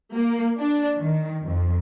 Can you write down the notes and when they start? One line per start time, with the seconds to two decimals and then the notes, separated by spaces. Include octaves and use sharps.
0.15 A#3
0.58 D4
0.98 D#3
1.45 F2